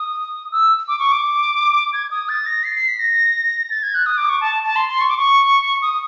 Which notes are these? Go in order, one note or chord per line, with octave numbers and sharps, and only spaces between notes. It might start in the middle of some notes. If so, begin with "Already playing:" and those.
Already playing: D#6
E6
D6
C#6
D6
G#6
D#6
A6
A#6
C7
C7
B6
A#6
A6
G#6
F#6
D#6
D6
C#6
A5
A5
C6
C6
C#6
D6
C#6
D#6